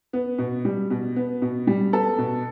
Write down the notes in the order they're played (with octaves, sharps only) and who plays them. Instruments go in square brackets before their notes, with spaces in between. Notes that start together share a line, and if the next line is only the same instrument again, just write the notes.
[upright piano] B3
B2
G3
B2
B3
B2
G3
B3 A4
B2